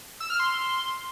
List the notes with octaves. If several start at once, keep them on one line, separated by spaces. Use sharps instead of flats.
E6
F6
C6